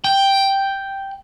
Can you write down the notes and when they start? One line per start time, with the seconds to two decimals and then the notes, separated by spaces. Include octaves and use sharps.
0.04 G5